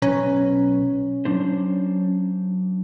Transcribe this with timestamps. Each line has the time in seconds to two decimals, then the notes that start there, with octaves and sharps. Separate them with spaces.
0.02 B1 C#4 B4 A#5
1.25 F#3 D4 C5